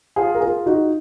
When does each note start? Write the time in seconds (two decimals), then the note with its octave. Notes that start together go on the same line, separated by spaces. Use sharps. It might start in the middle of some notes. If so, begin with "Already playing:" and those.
0.16 F4 G#4
0.35 A#4
0.41 F4 G#4
0.66 D#4 F#4